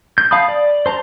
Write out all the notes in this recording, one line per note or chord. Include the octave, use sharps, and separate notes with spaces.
G6
F5 A5 B5 D#6
D5
C5 A5 A#5